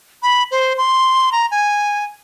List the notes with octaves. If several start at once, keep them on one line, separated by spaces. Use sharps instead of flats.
B5
C5
C6
A#5
G#5